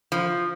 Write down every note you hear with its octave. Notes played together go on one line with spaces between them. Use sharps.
F3